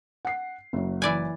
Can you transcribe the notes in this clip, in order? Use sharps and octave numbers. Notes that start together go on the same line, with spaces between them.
F#5 C7
F#1 F#3
E3 D5 G#5